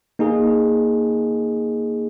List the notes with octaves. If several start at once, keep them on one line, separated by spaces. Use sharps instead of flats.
A#3 D#4 G#4